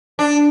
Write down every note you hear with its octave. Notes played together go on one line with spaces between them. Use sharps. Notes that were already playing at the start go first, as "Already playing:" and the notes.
D4